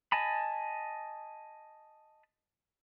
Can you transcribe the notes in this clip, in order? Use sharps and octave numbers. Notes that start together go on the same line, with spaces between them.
D#5 G#5 A5 B5